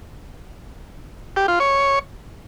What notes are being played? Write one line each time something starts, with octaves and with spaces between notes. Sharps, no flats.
G4
F4
C#5